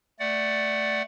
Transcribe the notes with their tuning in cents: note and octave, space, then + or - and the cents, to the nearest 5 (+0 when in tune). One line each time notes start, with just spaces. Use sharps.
A3 +0 D5 +0 F#5 +10